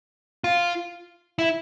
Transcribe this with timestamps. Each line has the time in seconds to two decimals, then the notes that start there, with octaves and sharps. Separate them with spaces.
0.44 F4
1.39 E4